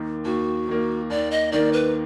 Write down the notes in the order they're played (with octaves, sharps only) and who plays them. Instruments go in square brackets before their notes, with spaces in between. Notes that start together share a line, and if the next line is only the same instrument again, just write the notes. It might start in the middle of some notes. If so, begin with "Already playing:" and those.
Already playing: [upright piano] D#2 D#3 A#3
[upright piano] D#2 [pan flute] F#4
[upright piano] D#3 A#3
[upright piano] D#2 [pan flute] D5
[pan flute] D#5
[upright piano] D#3 A#3 [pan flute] D5
[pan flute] B4